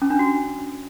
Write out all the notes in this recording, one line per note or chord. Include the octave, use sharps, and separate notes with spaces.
C#4
D4
F#4